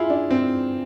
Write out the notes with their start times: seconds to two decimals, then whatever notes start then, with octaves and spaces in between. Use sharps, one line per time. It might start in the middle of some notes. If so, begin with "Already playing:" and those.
Already playing: E4 F4 G#4
0.10 D4
0.31 C4